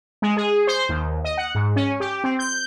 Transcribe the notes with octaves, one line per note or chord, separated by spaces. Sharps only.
G#3
G#4
C5
D#2
D#5
F#5
G#2
C#4
G4
C4
G6